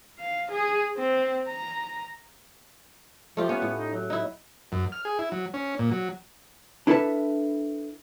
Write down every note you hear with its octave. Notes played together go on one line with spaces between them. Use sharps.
F5
G#4
C4
A#5
F3 A3 F4 G4
B3 C#4
A2
D#4
F#3
D#4 E4
F#2
F6
G#4
E4
F#3
C#4
A#2
F#3
D4 E4 A4 B4 E5 A5